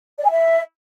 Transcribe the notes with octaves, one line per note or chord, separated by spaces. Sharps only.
D5
G#5
E5